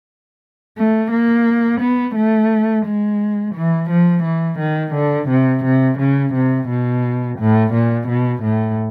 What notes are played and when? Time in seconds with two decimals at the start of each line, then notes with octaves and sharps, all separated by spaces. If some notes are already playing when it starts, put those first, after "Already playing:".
0.76 A3
1.11 A#3
1.80 B3
2.15 A3
2.85 G#3
3.55 E3
3.90 F3
4.23 E3
4.58 D#3
4.93 D3
5.28 C3
5.63 C3
5.98 C#3
6.33 C3
6.68 B2
7.38 A2
7.73 A#2
8.07 B2
8.42 A2